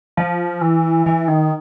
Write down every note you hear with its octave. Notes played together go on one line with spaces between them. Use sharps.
F3
E3
E3
D#3